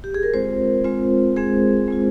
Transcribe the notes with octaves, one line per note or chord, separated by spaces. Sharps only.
G4
G#4
A#4
G#3 C4 F4 C5
G#3 C4 F4
G#3 C4 F4 G#4
G#3 C4 F4